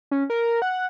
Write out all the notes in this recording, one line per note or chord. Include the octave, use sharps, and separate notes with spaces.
C#4
A#4
F#5